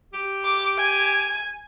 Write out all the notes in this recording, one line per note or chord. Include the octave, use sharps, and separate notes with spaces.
G4
D6
G#5